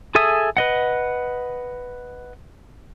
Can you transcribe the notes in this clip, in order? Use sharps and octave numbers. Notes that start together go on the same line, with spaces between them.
G#4 A4 E5 G#5 D#6
B4 D#5 F#5